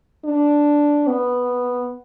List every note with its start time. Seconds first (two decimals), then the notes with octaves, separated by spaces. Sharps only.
0.25 D4
1.08 B3